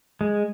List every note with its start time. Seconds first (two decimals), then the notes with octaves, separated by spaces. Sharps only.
0.21 G#3